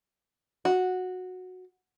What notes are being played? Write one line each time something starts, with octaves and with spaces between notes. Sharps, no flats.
F#4